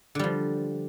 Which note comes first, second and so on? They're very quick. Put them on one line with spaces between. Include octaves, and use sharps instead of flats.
D3 G3 F3